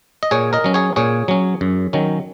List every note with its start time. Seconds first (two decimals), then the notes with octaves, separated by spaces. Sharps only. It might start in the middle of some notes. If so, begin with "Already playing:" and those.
0.23 D#5
0.31 A#2 G#4 C#5
0.53 A#4 D#5
0.64 F#3 C#4
0.74 G#4 C#5
0.96 A#2 G#4 C#5
1.28 F#3 C#4
1.61 F#2
1.93 D#3 F#3 C#4